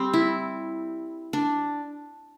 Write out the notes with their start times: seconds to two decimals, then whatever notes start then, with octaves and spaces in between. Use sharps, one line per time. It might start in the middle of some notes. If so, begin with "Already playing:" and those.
Already playing: G3 C4
0.13 E4
1.33 D4